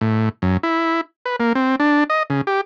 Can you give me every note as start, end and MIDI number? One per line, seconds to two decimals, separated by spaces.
0.01 0.29 45
0.42 0.57 42
0.63 1.01 64
1.26 1.36 71
1.40 1.53 58
1.55 1.76 60
1.80 2.04 62
2.10 2.23 75
2.30 2.41 49
2.47 2.61 67